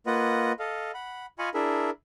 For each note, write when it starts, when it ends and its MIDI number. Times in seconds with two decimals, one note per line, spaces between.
0.07 0.52 58
0.07 0.52 65
0.07 0.52 71
0.07 0.52 75
0.07 0.52 78
0.59 0.92 69
0.59 0.92 75
0.59 0.92 77
0.94 1.26 78
0.94 1.26 83
1.39 1.49 65
1.39 1.49 75
1.39 1.49 77
1.39 1.49 80
1.39 1.49 83
1.39 1.49 85
1.54 1.90 62
1.54 1.90 64
1.54 1.90 68
1.54 1.90 70
1.54 1.90 76